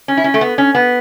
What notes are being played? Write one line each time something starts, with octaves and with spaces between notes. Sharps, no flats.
C#4
E4
C#4
A3
B3
C#4
B3